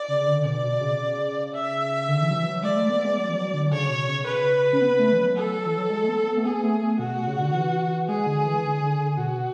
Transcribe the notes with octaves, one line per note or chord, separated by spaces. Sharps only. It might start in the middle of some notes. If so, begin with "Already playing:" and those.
Already playing: D5
C#3
C#3
D3
B2 D5
B2
C#3
C#3
E5
D3
E3
F#3
E3
F#3
G#3 D5
A3
B3
G#3
F#3
E3
F#3
D3
C#3 C#5
B2
C#3
C#3 B4
C#4
B3
B3
A3
E3
F#3
A4
E3
F#3
G#3
A3
B3
B3
A3
B3 G#4
A3
A3
B2 F#4
B2
C#3
D3
E3
G#3 G#4
D3
E3
D3
D3
D3
B2 F#4